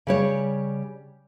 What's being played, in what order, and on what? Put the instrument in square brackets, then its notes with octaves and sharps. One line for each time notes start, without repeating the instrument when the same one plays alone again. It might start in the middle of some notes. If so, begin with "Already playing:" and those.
[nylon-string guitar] C#3 G3 C#5